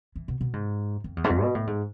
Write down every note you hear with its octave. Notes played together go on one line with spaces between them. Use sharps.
E3
B2
B2
G#2
F2
E2
G#2
F2
B2
A2
G#2